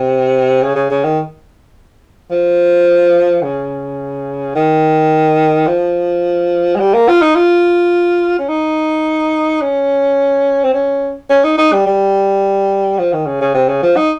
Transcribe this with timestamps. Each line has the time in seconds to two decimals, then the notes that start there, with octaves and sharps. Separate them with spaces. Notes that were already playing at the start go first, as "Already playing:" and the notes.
Already playing: C3
0.62 C#3
0.75 C#3
0.90 C#3
1.04 D#3
2.31 F3
3.43 C#3
4.55 D#3
5.67 F3
6.76 G#3
6.80 G3
6.94 A#3
7.08 F4
7.22 D#4
7.36 F4
8.39 C#4
8.49 D#4
9.61 C#4
10.64 C4
10.74 C#4
11.30 C#4
11.44 D#4
11.58 D#4
11.72 G3
11.86 G3
12.98 F3
13.13 D#3
13.26 C#3
13.41 C#3
13.54 C3
13.68 C#3
13.82 F3
13.96 D#4